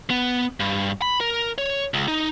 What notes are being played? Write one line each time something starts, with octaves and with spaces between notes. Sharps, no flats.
B3
G2
B5
A#4
C#5
C#2
D#4